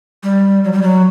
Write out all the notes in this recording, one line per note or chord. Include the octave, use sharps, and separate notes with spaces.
G3
F#3
G3
F#3